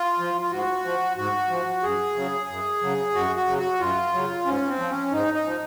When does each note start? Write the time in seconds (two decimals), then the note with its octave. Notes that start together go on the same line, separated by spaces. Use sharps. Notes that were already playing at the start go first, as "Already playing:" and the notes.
Already playing: F4
0.19 F3
0.41 F4
0.51 G#2 F#4
0.84 F3
1.17 G#2 F#4
1.50 F3
1.83 F#2 G#4
2.16 C#3 F#3
2.49 F#2
2.82 C#3 F#3
3.14 F#2 F#4
3.36 F#4
3.47 C#3 F#3
3.58 F#4
3.80 F#2 F4
4.13 C#3 F#3
4.46 G#2 C#4
4.68 C4
4.79 F3
4.90 C#4
5.12 G#2 D#4
5.34 D#4
5.45 F3